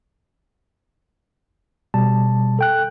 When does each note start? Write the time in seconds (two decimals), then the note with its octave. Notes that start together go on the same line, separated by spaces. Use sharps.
1.94 B2 G3 A5
2.59 A4 G5 F#6